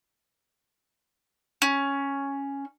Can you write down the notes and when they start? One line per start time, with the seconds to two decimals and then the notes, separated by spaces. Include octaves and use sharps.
1.62 C#4